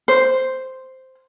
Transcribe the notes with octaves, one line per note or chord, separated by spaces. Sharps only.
C5